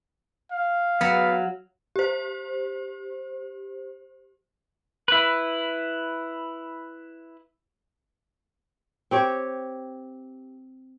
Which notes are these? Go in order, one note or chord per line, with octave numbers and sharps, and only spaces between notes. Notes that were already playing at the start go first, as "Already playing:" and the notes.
F5
F#3 B3
G4 C5
E4 B4
C4 G4 C#5